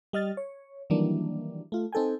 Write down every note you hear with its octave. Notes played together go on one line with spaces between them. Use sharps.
G3 D#5 F6 A6
C#5
D#3 E3 F#3 G3 A#3 D4
A3 F4
C4 D#4 A4 G5 G#5